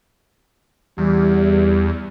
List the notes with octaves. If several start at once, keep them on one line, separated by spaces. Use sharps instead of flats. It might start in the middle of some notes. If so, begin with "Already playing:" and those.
E2 G3